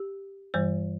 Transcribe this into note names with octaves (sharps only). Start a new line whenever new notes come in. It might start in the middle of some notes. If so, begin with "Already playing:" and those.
Already playing: G4
G2 E3 G3 C5